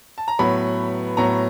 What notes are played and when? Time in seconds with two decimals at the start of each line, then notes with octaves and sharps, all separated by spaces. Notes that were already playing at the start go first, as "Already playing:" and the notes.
0.18 A5
0.28 A#5
0.39 A2 F#3 B3 B5
1.17 A2 F#3 B3 A#5